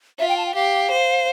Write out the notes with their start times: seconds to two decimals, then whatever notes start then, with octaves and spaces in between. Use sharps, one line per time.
0.19 F4 E5
0.28 G5
0.37 A5
0.46 G5
0.55 G4 F5
0.90 C5